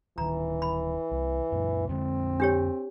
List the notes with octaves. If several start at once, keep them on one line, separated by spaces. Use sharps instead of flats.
D1 D#3 E3 A#5
B5
C2
F#2 A#2
F2 D3 G#3 C4
D4 G4 C#5